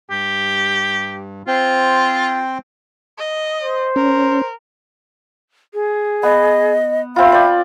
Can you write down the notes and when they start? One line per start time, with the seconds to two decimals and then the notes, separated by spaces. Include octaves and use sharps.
0.10 G2 G4
1.48 C4 F4 C5 G5
3.18 D#5
3.61 C5
3.96 C#4 A#4
5.74 G#4
6.23 B3 D#5
7.16 C4 F4 E5 B5
7.32 D5 G5